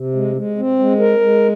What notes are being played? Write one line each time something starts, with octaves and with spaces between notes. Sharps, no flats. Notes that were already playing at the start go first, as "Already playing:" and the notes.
Already playing: C3
G#3
G#3
C4
G#3
A#4
G#3